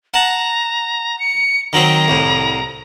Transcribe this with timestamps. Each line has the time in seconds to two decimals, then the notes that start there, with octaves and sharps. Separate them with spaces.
0.14 F#5 A5 A#5
1.19 C#7
1.73 D#3 F#3 C4 A#5
2.08 C2 A2